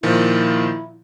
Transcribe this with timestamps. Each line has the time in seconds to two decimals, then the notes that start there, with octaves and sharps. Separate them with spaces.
0.03 A#2 D#3 F3 E4